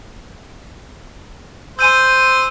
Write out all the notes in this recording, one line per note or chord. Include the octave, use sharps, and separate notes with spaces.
C5 G#5 E6 G6 D#7